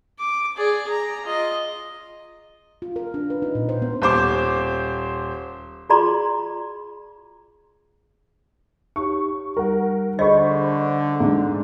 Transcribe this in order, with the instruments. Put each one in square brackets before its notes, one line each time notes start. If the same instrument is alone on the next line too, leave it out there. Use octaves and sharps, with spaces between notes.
[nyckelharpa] D6
G#4 D5
A#5
F4 D#5
[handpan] F4
A#4
D4
B4
D#4
A#2
C5
B3
[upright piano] D#1 C5 D6
[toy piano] F4 F#4 G#4 D5 A#5 C6
[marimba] D#4 G4 C#5 [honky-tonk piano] C#6
[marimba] G3 [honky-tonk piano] A#4 F#5
[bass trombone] D3 [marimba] G#4 [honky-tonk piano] C5 B5 C#6 [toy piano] D#5
[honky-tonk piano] G#2 D4